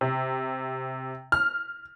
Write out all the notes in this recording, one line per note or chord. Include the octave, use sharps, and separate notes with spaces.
C3
F6